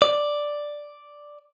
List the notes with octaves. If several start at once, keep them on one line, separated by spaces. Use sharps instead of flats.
D5